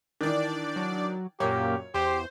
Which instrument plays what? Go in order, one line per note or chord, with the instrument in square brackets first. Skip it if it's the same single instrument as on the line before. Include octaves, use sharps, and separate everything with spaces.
[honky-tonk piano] D#3 E3 [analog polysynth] D4 D5
[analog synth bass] F#3
[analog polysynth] F#2 A#2 [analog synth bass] A#3 [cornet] G4 [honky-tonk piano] C#5
[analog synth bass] E2 [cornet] G4 [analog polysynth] C5